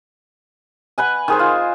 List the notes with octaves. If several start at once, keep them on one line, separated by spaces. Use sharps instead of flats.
B4 F#5 G#5
D#3 G#4 C5
F4